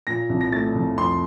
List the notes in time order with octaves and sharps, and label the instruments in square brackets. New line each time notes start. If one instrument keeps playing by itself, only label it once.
[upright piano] A#2 A#6
C2
A#6
A3 A6
C2
F2 C6